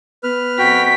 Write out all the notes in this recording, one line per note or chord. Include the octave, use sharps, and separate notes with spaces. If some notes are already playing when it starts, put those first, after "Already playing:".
B3 B4 F6
F2 F#4 G5 B6